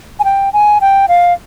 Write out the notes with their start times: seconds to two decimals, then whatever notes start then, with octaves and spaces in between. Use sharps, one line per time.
0.19 G#5
0.24 G5
0.53 G#5
0.81 G5
1.08 F5